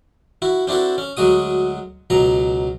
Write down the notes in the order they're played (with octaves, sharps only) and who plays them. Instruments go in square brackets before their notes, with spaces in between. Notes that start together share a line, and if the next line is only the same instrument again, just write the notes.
[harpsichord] E4 F#4
C4 D4 E4 F#4 A4
C#4
D2 F#3 G#3 F#4 D#6
C#2 B2 F#3 A#5